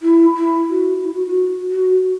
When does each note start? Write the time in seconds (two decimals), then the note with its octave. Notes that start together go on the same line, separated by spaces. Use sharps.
0.02 E4
0.36 E4
0.70 F#4
1.03 E4
1.15 F#4
1.27 F#4
1.71 F#4